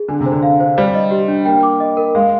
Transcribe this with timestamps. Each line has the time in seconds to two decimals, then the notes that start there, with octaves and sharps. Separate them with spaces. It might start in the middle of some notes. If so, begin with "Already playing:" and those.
Already playing: G#4
0.08 D3 G#5
0.20 C3
0.26 C5
0.32 D3
0.43 F5
0.60 C5
0.77 G3 C5
0.94 D#5
1.11 G4
1.28 D4
1.45 A#3 G5
1.63 D6
1.80 D#5
1.97 A#4
2.15 G#3 F5